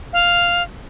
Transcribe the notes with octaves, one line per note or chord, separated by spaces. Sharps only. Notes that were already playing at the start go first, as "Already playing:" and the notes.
F5